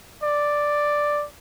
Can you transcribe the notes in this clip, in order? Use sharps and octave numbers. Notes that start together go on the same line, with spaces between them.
D5